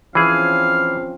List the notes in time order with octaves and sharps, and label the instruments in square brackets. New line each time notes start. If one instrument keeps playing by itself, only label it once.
[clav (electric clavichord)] E3 G#4 [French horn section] F3 C4 C#4 [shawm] F5